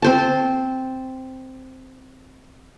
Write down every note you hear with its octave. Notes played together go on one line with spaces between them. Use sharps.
C4 C5 A5